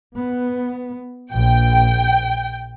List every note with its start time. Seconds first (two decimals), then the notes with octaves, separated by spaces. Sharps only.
0.17 B3
1.32 A#1 G5